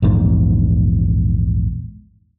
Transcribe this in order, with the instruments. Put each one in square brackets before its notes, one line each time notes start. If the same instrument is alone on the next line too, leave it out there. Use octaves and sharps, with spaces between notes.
[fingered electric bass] A#1 E2 G#2